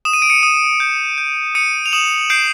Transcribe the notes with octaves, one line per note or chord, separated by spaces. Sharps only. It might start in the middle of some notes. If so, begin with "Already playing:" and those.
D#6 E7
D#7
D7
C#7 D#7
D#6
G6
G6
D#6 C#7 D#7
F7
D#6 E7 F#7
G6 C7 D7